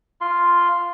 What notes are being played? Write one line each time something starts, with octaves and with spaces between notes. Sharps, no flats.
F4 C6